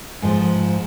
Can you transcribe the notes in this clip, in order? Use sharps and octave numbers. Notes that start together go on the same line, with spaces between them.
G#2 F3